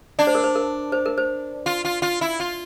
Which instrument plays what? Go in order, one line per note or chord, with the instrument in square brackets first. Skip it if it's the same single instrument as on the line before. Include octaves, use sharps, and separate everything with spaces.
[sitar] D4 [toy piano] D5
[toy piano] C5
A#4
C5
A#4
C5
A#4
C5
[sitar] F4
F4
F4
E4
F4